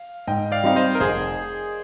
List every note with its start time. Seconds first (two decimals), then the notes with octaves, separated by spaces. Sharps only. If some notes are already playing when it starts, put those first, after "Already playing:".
Already playing: F5
0.27 G#2 D#5 G5
0.52 D5 F5
0.64 G3 C4 D#4 G4 F5
0.76 C5 D#5
0.95 A#4
1.00 F1 G#4 C5